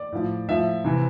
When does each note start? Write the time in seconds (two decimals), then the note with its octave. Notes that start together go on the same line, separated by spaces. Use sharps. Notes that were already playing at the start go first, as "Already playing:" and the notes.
Already playing: D5
0.12 A2 F3
0.48 A2 F3 E5
0.84 C3 E3